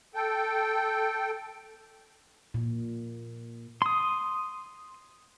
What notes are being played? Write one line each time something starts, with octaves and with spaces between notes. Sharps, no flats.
A4 G5
A#2
C6 D#6